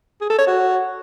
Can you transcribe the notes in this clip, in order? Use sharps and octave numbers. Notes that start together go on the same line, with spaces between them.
G#4
A4
C#5
F#4